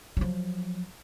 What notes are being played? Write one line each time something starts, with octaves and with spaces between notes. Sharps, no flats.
F3 F#3